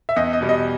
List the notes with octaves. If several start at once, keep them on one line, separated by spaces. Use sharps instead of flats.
E5
E2 D#5
D#5
B2 G3
D#5